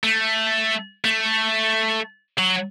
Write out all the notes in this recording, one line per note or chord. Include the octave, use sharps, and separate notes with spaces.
A3
A3
F#3